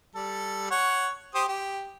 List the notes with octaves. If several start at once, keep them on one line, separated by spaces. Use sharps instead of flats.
G3 A4
C#5 F#5
G4 C5 D#6
G4